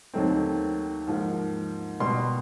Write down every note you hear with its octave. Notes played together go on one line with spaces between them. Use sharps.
D#2 D#3 F#3 A3 C4
G#2 F3 A#3
B2 G3 B3 C6